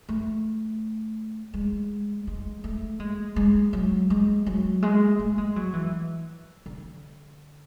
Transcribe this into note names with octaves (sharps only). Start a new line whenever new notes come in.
A3
G#3
G#3
A3
G#3
G#3
F#3
G#3
F#3
G#3
A3
G#3
F#3
E3
D3